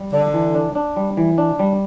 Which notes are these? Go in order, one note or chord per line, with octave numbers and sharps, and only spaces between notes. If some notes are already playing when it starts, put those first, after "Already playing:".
Already playing: G3
D3 D4
E3
D4
D4
G3
E3
D4
G3